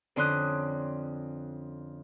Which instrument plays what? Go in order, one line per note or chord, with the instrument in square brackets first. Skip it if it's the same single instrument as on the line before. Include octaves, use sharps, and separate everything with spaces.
[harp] F2 D3 C#4 C6 D#6 F#6